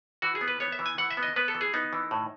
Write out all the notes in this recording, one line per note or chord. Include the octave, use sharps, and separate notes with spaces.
E3 F#4
G#4
B3
B4
B3 C#5
E5
E3
G#5
E3 F#5
E5
B3
D#5
B3 B4
A4
E3
G#4
B3 D#4
E3
A2